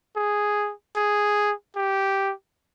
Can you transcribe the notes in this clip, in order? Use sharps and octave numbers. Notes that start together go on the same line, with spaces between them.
G#4
G#4
G4